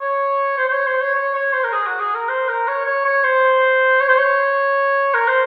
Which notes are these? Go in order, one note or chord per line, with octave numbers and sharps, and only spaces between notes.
C#5
C5
C5
C#5
C5
C#5
C#5
C#5
C5
A#4
G#4
F#4
G#4
A#4
C5
A#4
C#5
C#5
C#5
C5
C#5
C5
C#5
A#4
C5